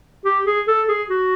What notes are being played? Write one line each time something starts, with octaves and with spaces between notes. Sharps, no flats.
G4
G#4
A4
G#4
F#4